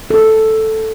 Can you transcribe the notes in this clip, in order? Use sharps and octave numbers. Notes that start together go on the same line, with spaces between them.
A4